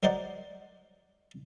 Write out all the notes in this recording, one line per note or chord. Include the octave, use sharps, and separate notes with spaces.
F#3 A#4 C5 D5 D#5 F#5